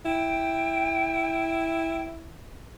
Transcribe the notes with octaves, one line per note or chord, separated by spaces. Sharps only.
E4 G5